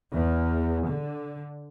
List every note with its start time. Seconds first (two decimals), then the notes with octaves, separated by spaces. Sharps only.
0.12 E2
0.87 D3